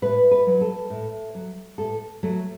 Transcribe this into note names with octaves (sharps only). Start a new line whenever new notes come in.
A2 B4
B4
F#3
A4
A2
F#3
A2 A4
F#3 A3